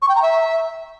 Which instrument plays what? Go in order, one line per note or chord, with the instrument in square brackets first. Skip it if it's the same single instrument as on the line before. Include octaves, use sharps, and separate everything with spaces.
[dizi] C#6
G5
A#5
E5